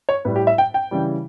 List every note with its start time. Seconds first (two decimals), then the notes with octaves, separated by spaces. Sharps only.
0.09 C#5
0.25 A2 G3 B4
0.36 G4
0.47 E5
0.58 G5
0.74 G5
0.91 C#3 E3 G3